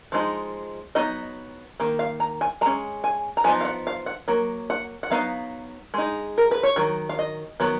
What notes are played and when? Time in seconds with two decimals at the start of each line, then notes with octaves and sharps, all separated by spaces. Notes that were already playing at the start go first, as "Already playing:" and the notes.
0.12 F3 G#3 D#4
0.95 F#3 B3 D#4 D#5
1.80 D#3 A#3
1.99 F5
2.20 A#5
2.41 G#5
2.61 G#3 C#4 A#5
3.04 G#5
3.37 A#5
3.44 F3 B3 D#4 G#5
3.61 F5
3.65 F#5
3.87 F5
4.06 F#5
4.28 F#3 A#3
4.70 F#5
5.03 F#5
5.10 F#3 B3 D#4 F5
5.94 G#3 D#4
6.38 A#4
6.51 B4
6.63 C#5
6.76 D#3 F#3
7.09 F5
7.19 D#5
7.60 D#3 F#3 B3